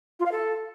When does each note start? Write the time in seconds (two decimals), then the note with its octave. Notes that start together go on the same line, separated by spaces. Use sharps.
0.19 F4
0.25 F5
0.31 A4